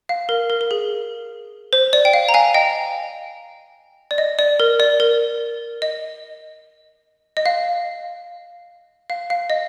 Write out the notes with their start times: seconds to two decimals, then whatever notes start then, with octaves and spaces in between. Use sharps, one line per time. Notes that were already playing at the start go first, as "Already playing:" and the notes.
0.09 F5
0.29 A#4
0.50 A#4
0.61 A#4
0.71 G#4
1.73 C5
1.93 D5
2.05 G5
2.13 F5
2.29 A#5
2.34 F5 G#5
2.54 D#5 G5
4.11 D5
4.18 D#5
4.39 D5
4.60 A#4
4.80 D5
5.00 A#4
5.82 D#5
7.37 D#5
7.46 F5
9.10 F5
9.30 F5
9.50 D#5